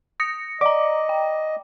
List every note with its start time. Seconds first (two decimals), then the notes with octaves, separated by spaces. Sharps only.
0.20 D#6 A#6 C#7
0.61 D5 D#5 A#5 D6
1.09 G5